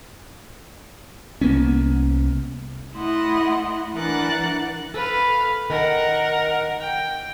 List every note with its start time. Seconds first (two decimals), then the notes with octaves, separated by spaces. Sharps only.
1.41 C2 A#3 B3 C#4
2.96 A3 E4 D#5 F#5 C6
3.94 E3 D4 A#4 F#5 F#6 A6
4.94 A4 B4 F5
5.70 D#3 A#4 F#5
6.80 G5